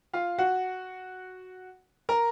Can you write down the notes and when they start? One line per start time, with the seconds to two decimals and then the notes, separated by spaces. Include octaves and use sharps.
0.14 F4 F5
0.38 F#4 F#5
2.09 A#4 A#5